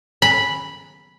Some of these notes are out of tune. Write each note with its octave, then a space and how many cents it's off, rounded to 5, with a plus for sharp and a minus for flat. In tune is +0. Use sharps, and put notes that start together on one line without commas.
B5 -5